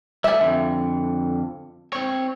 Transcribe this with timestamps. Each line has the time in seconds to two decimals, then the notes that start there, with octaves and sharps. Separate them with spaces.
0.24 G3 A3 E5 G#5
0.41 F2 D3
1.93 C4 C#5